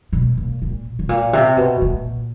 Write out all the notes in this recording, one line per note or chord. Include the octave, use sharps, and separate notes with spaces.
B2
A#2
A#2
A2
A#2
C3
B2
A#2